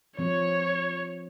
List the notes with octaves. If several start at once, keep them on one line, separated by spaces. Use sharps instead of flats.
F3 C4 C#5